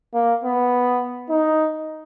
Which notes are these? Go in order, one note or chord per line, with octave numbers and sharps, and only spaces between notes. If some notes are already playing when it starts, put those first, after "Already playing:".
A#3
B3
D#4